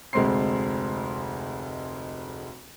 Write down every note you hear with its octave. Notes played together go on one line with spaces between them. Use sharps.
F1 D2 G#3 C4 C6 C7